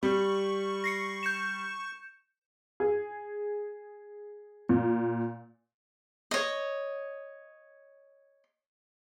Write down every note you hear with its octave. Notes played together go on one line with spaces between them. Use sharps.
G3 C#6
A#6 C7 C#7
G6 C#7 E7
G#4
A#2
C#5 D#5